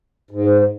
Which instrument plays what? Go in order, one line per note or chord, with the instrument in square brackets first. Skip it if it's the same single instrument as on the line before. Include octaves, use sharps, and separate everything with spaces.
[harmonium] G#2